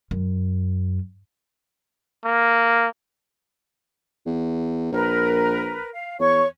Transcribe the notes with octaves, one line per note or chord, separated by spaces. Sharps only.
F#2
A#3
E2
A#1 A#4 B4
F5
E2 C#5 C#6